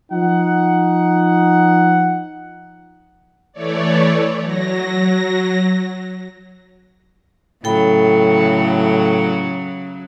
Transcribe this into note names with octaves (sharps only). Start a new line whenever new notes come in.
F3 D#4 F#5
E3 A3 C#5 D5
F#3 A#6
A2 C#3 F#3 A4 G5 B5